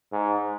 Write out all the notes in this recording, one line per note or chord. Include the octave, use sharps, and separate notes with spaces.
G#2